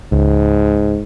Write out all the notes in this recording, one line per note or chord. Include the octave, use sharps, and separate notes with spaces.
C#2 G#2